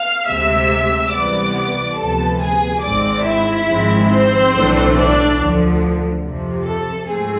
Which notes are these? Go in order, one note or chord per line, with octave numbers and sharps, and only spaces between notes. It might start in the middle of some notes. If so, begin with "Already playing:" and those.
Already playing: F5 F6
D2 C3 G#3 E5 E6
C2 C3 E3 B3 D5 D6
D2 C3 F3 B3 A4 A5
G#4 G#5
G#1 G#2 G#3 C4 D5 D6
E4 E5
G#1 G#2 F3 G#3 C4
C4 C5
B1 A2 E3 A3 D4
D4 D5
D2 D3 F3
F2 C3 F3
A4
G#2 F3 A3 C4 G#4